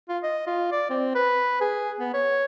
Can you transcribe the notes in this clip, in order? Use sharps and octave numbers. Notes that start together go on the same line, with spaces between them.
F4
D#5
F4
D5
C4
B4
G#4
B3
C#5